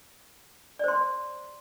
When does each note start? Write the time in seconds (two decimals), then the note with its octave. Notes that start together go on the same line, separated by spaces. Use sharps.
0.79 D5
0.84 C5
0.88 C6